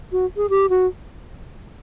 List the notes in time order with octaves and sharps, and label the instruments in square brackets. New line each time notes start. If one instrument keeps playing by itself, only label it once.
[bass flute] F#4
G#4
G4
F#4